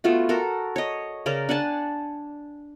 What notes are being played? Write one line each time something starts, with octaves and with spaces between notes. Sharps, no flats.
A3 B3 F4 F#4
F#4 A4 A#4
C#5 D#5
C#3 C#4 A#4 D5
D4 F#5 G#5 A5